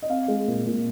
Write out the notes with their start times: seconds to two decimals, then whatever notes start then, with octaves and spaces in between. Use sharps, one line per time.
0.02 D#5
0.10 C4 F5
0.28 G#3
0.48 A#2
0.66 A#2